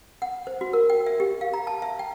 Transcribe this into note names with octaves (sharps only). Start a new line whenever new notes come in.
F#5
C5
F#4
A#4
G5
E5
G4
F5
A#5
A5
E5
G5